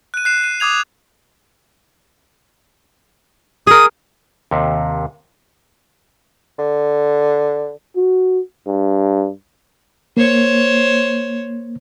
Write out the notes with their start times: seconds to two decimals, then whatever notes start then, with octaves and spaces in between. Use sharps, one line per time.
0.14 F#6 D#7
0.25 F#6 C7 E7
0.44 D#7
0.60 D6 D#6 G#6 F7
3.67 G#4 A#4 D#6
4.51 D#2 C3
6.59 D3
7.96 F#4
8.67 G2
10.17 A#3 C5 C#5